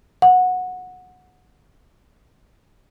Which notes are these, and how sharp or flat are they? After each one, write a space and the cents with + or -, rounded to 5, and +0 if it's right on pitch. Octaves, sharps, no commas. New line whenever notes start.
F#5 -15